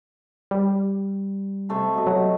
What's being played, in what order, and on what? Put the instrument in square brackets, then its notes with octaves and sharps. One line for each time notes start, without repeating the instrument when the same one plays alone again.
[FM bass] G3
[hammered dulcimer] C3 A3 C5
B2 D#5
[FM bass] F#3